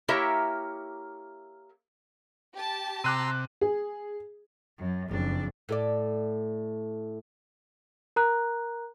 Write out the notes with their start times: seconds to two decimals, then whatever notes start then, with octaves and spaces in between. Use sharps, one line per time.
0.08 A#3 E4 G4 A#4 C#5 E5
2.54 G4 A5
3.04 C3 A#5 C6 D6 E6 F#6 D#7
3.61 G#4
4.78 F#2
5.09 F#1 F2 D4
5.69 A2 A4 D5
8.16 A#4 A#5 F#6